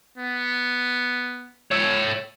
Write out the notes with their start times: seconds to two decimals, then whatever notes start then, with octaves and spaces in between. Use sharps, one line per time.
0.18 B3
1.72 C#5 E5